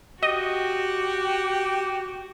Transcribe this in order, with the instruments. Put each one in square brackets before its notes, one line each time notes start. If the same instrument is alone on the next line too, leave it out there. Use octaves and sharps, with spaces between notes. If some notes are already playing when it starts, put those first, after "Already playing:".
[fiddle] F#4 [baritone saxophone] G4 [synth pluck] D#5